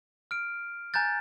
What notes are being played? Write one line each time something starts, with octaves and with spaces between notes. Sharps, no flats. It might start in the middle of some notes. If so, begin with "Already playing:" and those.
F6 D7
G#5 A#5 F#6 G6 A6